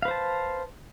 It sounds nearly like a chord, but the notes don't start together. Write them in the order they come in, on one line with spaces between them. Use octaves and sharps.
F5 B4 C5 A5